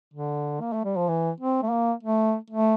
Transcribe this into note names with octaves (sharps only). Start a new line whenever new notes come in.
D3
A#3
A3
G3
F3
E3
C4
A3
A#3
A3
A3